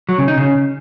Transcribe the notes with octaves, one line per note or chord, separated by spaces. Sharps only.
F#3
C#3
D#4
C#3